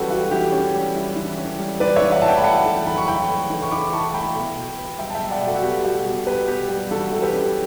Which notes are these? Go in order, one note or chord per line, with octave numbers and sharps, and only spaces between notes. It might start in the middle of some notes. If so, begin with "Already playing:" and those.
Already playing: E3 G3 C#4 E4 F#4 G4 A4 B4
E4 F#4
E3 G4
C#4
G3
E4
E3
C#4
G3
E3 B4 D5
C#5 E5
E3
D5 F#5
E4 A5
E5 G5
B5
A3 F#5 A5
E3
E3 B5
C#6
E4 G5 B5
A3
E3
C#6
E3 B5 D6
E4 A5 C#6
A3 G5 B5
B2
B2
B3
G3 E5 G5
A5
E5 G5
B2
D5 F#5
B2 F#4 A4
F#4
B3 G4
G3 F#4
B2 G4
B2 G4 B4
B3 G4
G3 G4
E3 F#4 A4
E3 A4
G4 B4
C#4